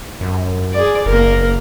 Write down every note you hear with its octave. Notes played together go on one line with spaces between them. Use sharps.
F#2
G#4 D5
F#1 A#3 A#4